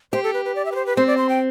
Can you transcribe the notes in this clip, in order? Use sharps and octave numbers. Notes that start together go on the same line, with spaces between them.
G4 C5
A4
B4
B4
D5
E5
B4
C5
B4
C4 C5
D5
C6
G5